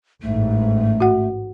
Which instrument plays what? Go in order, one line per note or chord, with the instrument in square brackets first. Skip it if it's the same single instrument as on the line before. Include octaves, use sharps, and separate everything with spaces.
[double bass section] A1 G#2 [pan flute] A3
[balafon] F#4 F#5